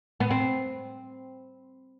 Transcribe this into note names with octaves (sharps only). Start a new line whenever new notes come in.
B3
C4